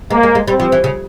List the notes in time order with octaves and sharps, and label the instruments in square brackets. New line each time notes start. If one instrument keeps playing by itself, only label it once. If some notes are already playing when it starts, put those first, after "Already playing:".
[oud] G#3 [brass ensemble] A#3
[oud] G#3
G#3
[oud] G3 [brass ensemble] C4
[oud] F3
E3
C#3